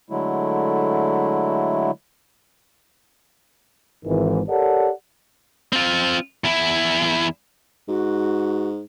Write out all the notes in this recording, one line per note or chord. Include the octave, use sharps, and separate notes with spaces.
D3 F#3 G#3 A3 E4
G#1 G#2 D#3 E3
G4 A4 A#4 C#5 D5 F#5
C4 F4
E2 E4
G#2 F#4